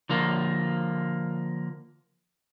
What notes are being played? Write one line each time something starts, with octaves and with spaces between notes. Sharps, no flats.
D3 F3 A#3